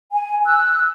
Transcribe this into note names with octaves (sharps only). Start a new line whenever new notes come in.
G#5
E6 F#6